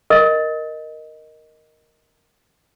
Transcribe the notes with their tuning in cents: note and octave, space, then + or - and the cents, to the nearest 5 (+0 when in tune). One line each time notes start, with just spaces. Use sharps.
A#4 +0 D#5 +0